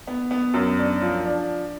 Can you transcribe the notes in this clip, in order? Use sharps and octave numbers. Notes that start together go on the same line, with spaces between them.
B3
B3
F#2
D4
F3
D4